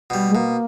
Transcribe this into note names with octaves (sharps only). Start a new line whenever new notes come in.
B2 G3
G#3
B2 A#3